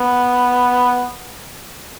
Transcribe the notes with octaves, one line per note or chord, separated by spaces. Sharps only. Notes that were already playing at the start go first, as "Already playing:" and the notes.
Already playing: B3